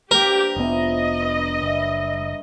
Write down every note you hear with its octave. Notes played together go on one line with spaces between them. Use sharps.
G2 A#3 G4 A#4 C5
F1 D3 F3 B3 E4 D#5
G2
F#1 G3 E5